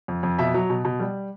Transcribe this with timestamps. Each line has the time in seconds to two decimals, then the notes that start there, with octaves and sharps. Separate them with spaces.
0.08 F2
0.23 F2
0.39 B2 E5
0.54 F#3
0.70 B2
0.85 B2
1.00 G3